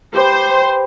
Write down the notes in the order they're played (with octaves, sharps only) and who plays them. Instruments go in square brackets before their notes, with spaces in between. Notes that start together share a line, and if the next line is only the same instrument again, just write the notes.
[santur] G4 B4 [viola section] C5